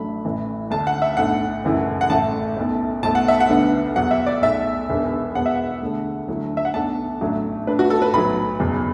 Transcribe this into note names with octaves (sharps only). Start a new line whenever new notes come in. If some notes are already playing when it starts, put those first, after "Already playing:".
Already playing: A1 A2 F#3 A3 D4 B5
A1 A2 E3
D2 D3 A3 D4 A5
F#5
E5
B1 A2 A3 D4 F#5
F#1 F#2 E3 A3 E4
F#5
A1 A2 A3 A5
B1 B2 A3
B1 B2 A3 A5
F#5
E5
F#5
D2 D3 B3 D4
E2 B2 F#3 F#5
E5
D5
B1 B2 A3 E5
E1 E2 B2 B3 D4
E2 B2 B3 F#5
E5
F#5
D2 D3 A3
D2 D3 F#3 A3 E4
E5
F#5
B1 B2 A3 D4 A5
A1 A2 F#3 A3 D4
A2 A3 D4 B4
F#4
A4
B4
B1 A2 F#3 B5
F#1 E2 B2 F#3